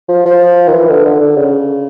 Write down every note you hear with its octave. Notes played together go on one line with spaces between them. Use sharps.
F3
F3
D#3
E3
D3
D3
D3
C#3